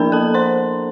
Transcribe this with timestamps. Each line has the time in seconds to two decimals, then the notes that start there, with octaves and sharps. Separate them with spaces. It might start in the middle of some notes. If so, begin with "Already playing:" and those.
Already playing: F3 A#3 D4 A#4 A#5
0.12 A4 A5
0.34 C5 C6